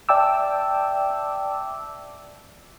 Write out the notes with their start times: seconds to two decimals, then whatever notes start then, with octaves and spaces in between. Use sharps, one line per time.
0.09 D5 E5 G5 A5 D6 E6